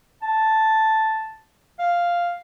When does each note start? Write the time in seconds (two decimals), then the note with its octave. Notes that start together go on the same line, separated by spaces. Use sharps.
0.22 A5
1.79 F5